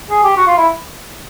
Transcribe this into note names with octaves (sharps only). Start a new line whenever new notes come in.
G#4
G4
F#4
F4
E4